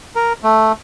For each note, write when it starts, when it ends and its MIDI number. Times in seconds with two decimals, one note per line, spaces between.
0.16 0.33 70
0.43 0.72 57